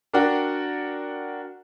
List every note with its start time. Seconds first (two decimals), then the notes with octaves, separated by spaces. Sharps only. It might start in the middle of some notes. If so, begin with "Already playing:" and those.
0.13 D4 F#4 A#4 D5 F#5 G5